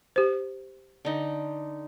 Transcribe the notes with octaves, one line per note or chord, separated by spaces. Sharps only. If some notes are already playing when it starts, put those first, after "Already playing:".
G4 C5
D3 D#4